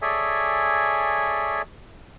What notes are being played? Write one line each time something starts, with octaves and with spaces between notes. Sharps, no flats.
G#4 A4 C#5 D5 E5 G#5